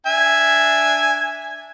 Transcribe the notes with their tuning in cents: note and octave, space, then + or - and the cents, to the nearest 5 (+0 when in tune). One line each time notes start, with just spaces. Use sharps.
D4 +0 E5 +0 G#5 -5